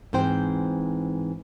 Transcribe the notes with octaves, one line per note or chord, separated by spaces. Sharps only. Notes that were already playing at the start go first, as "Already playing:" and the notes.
G#2 E3 C4 C5 G5